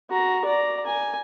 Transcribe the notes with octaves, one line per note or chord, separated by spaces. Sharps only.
F#4 A#5
D5 A#5
G#5